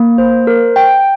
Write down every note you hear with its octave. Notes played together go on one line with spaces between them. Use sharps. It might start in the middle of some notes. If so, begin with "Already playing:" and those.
Already playing: A#3
C5
A#4
G5